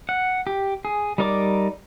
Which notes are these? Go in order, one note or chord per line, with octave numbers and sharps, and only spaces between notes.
F#5
G4
G#4
G3 D#4 A#4 D5 D6